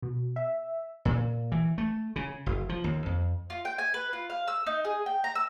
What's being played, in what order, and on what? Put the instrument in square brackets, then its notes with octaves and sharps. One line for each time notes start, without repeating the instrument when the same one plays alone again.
[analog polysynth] B2
E5
[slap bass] A#2
E3
A3
C#3
F#1
F3
D#2
F2
[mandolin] F4
G5
G#5
B4
F4
F5
E6
D#4
G#4
G5
A#5
E6